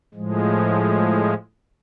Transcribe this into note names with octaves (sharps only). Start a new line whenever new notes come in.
A2 F3 G#3